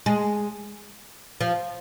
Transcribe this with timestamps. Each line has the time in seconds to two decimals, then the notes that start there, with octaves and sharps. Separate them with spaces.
0.06 G#3
1.41 F3